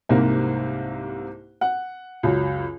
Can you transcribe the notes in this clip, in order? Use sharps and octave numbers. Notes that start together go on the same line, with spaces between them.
C2 G#2 C3 A#3
F#5
C#2 F#2